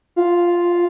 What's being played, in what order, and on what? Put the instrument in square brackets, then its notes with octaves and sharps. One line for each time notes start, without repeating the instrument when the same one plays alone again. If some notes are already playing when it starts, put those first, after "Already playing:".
[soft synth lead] F4